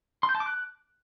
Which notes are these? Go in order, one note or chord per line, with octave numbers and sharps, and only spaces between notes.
C6
G6
A5
D6
F#6